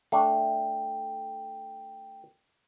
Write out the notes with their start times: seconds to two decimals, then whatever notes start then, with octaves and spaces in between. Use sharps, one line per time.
0.12 A3 D4 G5